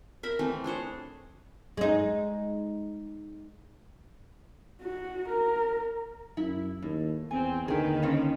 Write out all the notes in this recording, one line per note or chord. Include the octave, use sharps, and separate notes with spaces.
A#4 E5 B5
E3 A3 C4
D4 G#4 C5 C#5
G#3 D#4
F#4
A#4
F#2 E4
D#2 A2
E2 C4 G#5
D#2 D3 D#3 G#4 B4 G5
C#3 C4 C#4